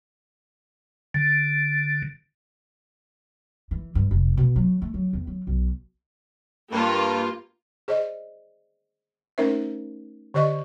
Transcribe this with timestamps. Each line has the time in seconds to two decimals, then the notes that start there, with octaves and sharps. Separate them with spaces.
1.14 D3
3.71 E3
3.95 G2
4.11 F1
4.37 B2
4.56 F#3
4.82 A3
4.94 F#3
5.13 E2
5.27 F#3
5.47 B1
6.72 G2 A#3 F4
7.88 G#4 C5 D5 D#5
9.38 A3 C#4 D#4 A#4 C5 E5
10.34 D3 G4 C5 D5 D#5 C#6